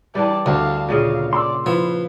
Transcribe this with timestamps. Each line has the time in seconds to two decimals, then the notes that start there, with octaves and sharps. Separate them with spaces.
0.15 E3 G3 D5 A5
0.46 D2 D3 F5 A5
0.89 A#2 C#3 D#5 F5
1.33 D5 C6 E6
1.66 F3 E4 B4